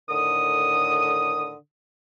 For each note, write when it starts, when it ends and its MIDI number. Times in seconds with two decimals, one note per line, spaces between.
0.09 1.53 45
0.09 1.53 50
0.09 1.53 51
0.09 1.53 87